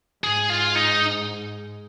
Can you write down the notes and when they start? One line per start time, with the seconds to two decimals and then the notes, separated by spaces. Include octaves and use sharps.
0.23 G#2 G#4
0.50 F4
0.76 D#4